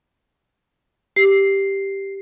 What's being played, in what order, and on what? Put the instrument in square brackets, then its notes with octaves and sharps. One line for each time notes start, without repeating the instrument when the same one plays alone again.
[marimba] G4 [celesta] C7